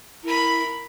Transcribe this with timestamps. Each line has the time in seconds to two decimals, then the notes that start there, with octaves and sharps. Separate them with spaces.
0.23 E4 A#4 B5